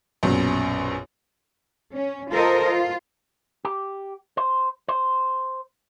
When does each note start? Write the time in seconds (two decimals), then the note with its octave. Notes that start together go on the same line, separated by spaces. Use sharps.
0.23 A#1 F#2 B2
1.92 C#4
2.31 F4 A4 A#4 C5 D#5
2.65 F4
3.65 G4
4.37 C5
4.88 C5